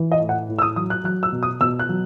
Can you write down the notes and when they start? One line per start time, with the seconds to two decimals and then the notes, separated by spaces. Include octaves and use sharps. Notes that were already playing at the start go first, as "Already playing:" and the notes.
Already playing: E3
0.12 D#5
0.20 A2
0.29 F#5
0.49 A2
0.59 E6
0.62 D#6
0.76 F#3 D#6
0.90 F#6
1.04 F#3 F#6
1.23 E6
1.32 B2
1.43 D#6
1.60 B2 E6
1.79 F#6
1.89 F#3